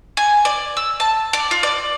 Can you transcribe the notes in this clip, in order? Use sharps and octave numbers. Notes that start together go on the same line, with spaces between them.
G#5
D5
E6
A5
D5
F4
D5